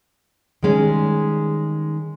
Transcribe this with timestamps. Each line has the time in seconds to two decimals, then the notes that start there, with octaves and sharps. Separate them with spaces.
0.63 D#3 G3 G#3 C#4